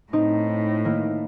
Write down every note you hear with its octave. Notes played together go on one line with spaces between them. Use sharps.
A2 C4 D#4
D#3 A#3 E4